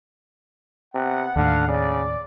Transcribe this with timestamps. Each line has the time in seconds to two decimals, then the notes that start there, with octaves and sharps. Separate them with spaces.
0.94 C3 B3 F#5
1.36 D#2 A2 D3 F5 F#5
1.68 C#3 D5